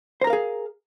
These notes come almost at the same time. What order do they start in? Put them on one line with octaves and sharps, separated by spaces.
C5 A#5 A#4 F5 G#4